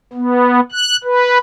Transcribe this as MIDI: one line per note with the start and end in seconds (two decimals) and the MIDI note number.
0.13 0.60 59
0.72 0.97 90
1.04 1.38 71